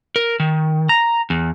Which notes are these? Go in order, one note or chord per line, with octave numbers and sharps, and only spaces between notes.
A#4
D#3
A#5
E2